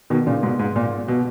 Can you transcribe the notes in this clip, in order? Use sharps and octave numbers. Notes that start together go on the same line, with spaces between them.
B2 D#3
A#2 C#3
G#2 B2
G#2
A#2
B2